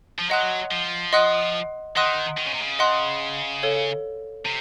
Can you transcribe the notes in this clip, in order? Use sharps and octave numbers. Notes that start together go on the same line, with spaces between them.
F3
F#3 D#5 F#5 C6 D#6 F#6
F3
D#5 F#5 C6 D#6 F#6
D#3 D#5 F#5 C6 D#6 F#6
D#3
C#3
C3
C#3
D#5 F#5 C6 D#6 F#6
A4 C#5 F5
C3